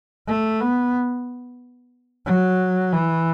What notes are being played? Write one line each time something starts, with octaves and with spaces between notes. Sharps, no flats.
A3
B3
F#3
E3